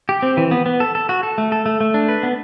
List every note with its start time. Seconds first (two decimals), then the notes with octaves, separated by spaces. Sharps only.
0.09 G4
0.22 C4
0.37 E3
0.51 B3
0.66 B3
0.80 A4
0.95 A4
1.09 F#4
1.23 A4
1.38 A3
1.52 A4
1.66 A3
1.80 A3
1.94 D4
2.08 B4
2.23 B3